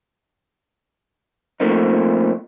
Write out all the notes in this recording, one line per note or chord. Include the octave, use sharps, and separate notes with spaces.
F3 A3 A#3 C4 D#4